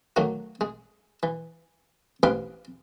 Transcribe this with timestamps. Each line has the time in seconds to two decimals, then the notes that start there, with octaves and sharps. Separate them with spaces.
0.16 D#3 F#3 A3 A#3
0.61 G#3
1.23 E3
2.23 A1 G#2 B4 F5 C6 D6